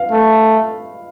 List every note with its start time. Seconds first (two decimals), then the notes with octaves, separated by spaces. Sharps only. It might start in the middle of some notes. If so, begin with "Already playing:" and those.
Already playing: B4 F5
0.12 A3